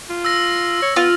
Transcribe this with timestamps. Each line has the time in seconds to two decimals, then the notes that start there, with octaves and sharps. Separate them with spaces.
0.10 F4
0.25 E6 A#6
0.82 C#5
0.96 B3 F4